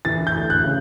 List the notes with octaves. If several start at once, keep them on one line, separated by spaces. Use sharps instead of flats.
E3 A6
G6
D2
F#6
C#3